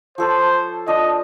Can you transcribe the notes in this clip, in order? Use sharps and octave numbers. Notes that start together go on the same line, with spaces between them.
F3 A4 C5 C#5
F3 D4 D#5